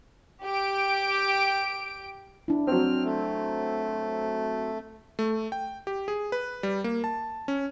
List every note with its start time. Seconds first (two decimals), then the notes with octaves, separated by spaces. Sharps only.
0.44 G4 D7
2.48 D4 E4
2.67 F#3 C4 F6
3.05 A3
5.19 A3
5.52 G5
5.87 G4
6.08 G#4
6.32 B4
6.63 G3
6.84 A#3
7.04 A5
7.48 C#4